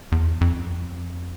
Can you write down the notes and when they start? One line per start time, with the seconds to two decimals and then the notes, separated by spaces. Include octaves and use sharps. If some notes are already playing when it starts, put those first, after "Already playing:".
0.12 E2
0.41 F2